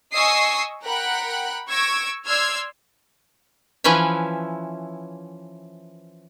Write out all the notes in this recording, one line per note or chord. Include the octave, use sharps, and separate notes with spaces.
D#5 G#5 C#6 D#6 E6 C7
A#4 F#5 G5 B5 F#6
C#6 E6 G#6 A#6 D7
D5 C6 E6 F6 G#6
E3 F3 C#4 B4 E5